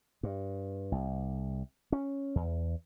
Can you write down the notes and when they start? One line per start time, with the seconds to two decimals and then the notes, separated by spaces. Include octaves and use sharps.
0.23 G2
0.92 C2
1.92 C#4
2.36 E2